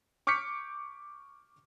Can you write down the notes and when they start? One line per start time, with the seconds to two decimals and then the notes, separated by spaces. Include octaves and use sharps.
0.27 C#6 D6 F6 G6 B6 C#7